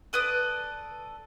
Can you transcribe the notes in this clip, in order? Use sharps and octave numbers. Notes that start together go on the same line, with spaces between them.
A4 B4 D5 D#6